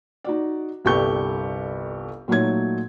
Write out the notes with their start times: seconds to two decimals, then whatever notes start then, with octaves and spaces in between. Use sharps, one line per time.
0.24 D#4 F#4 D5
0.85 G1 C2 G4 A4 C#6 G6
2.28 A#2 F#3 A3 D#4 C#5 G#6